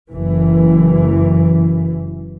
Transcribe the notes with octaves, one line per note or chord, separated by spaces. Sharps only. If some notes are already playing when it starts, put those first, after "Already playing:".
F#1 E3